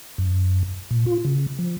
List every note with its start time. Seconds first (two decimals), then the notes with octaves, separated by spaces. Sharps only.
0.18 F#2
0.91 A#2
1.06 F4
1.25 C#3
1.59 F3